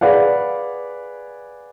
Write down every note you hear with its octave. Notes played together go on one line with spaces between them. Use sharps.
G#4 B4 D5 F5 F#5